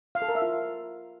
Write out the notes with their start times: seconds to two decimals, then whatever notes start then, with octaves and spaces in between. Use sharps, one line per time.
0.15 F5
0.22 A4
0.28 A#4
0.35 E5
0.42 F4